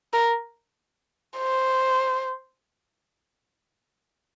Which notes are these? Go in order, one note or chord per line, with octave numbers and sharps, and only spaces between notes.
A#4
C5